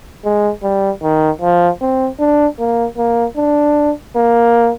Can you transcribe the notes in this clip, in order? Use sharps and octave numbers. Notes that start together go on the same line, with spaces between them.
G#3
G3
D#3
F3
C4
D4
A#3
A#3
D4
A#3